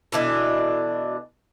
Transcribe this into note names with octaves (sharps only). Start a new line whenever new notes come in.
B2 E3 D4 A4